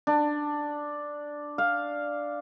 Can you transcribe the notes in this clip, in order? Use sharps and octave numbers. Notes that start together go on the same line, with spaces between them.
D4
F5